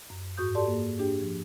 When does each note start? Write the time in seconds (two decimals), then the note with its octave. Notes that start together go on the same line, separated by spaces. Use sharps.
0.10 F#2
0.37 G#2 F#4 C#6 D#6 G6
0.55 G4 A4 D5 A5 C6
0.68 A#3 G#4
0.99 D4 G4 G#4 G5
1.21 F3